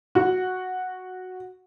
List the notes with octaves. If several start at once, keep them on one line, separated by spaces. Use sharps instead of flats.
F#4